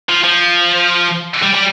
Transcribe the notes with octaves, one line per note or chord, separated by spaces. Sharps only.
F3
F3
G3
G3